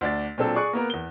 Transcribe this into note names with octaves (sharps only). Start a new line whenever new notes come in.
D2 D4 A6
A#2 F#3 C4 D4 A4
G#4 D5 C#6 F#6
A#3 B3 A#4
E2 G7